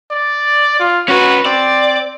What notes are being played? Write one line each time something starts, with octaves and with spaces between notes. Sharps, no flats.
D5
F4
C#4 F#4 B4
C4 D5